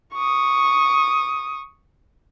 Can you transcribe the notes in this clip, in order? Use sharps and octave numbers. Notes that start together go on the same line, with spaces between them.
C#6 D#6